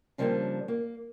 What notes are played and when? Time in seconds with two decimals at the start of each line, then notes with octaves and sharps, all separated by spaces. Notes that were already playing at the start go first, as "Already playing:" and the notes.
0.18 C#3 F3 G3 A#3 C#4 D4
0.68 A#3